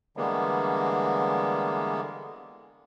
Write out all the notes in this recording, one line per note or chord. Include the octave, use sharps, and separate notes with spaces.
D3 E3 G3 G#3 A#3 B3